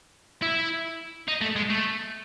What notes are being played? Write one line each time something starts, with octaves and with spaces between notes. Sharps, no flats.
E4
D#4
A3
G#3
A3